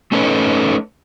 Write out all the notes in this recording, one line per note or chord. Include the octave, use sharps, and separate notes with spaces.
A3 C#4 D#4 A4 B4 C#5